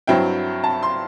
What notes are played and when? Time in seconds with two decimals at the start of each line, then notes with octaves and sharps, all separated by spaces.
0.07 G2 F#3 C4 E4 G5
0.64 A5
0.83 C6